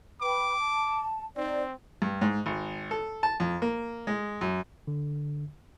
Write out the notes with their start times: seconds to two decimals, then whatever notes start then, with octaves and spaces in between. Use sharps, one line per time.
0.21 B4 G5 B5 D6
0.60 A5
1.37 C4 D#4 C5 D5
2.02 G2
2.21 G#2
2.46 G#1
2.91 A4
3.23 A5
3.40 F2
3.62 A#3
4.07 G#3
4.41 F#2
4.87 D3